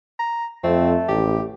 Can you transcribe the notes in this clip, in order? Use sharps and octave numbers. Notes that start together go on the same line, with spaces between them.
A#5
F2 A3 C4
A1 G4